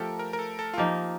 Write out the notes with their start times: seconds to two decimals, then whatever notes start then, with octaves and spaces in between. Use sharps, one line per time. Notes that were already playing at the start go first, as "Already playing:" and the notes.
Already playing: F3 A3 G4 A4 A#4
0.19 A#4
0.33 A#4
0.39 A4
0.59 A4
0.74 F4
0.77 F3 A#3 D#4 G4